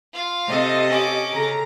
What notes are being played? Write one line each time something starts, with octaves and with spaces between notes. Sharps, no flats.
F4 F5
C3 G4 A4 D#5
C#4 D6
C#3 A4 A#4 A#5